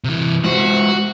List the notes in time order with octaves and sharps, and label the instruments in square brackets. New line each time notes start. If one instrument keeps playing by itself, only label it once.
[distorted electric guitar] C3 E3
[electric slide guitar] G#3 F4 C5 [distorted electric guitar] F#4